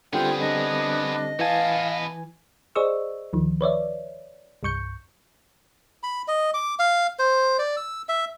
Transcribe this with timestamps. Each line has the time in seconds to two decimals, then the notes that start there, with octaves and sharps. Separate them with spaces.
0.13 D3 G3 B3 C4 F4 G#4 G5
0.40 D4 D#5
1.39 E3 B3 F5 G#5 A5
2.75 G#4 C5 D5 D#5 C#6 E6
3.33 D2 D#3 F3
3.61 B4 C#5 D5 E5
4.63 C2 G2 C#6 G6 C#7
6.03 B5
6.28 D#5
6.54 D6
6.79 F5
7.19 C5
7.59 D5
7.77 E6
8.09 E5